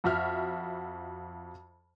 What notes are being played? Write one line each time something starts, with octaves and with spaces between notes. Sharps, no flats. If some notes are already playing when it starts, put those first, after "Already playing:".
F2 F#4 E5 F6